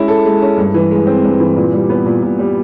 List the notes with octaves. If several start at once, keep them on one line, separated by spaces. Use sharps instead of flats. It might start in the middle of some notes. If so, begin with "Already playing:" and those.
Already playing: G#3 C#4 E4
A4
G#3
C#4
G2
E3
G#3
C4
G2
E3
A#2
G3
B3
A#2
A#2
G3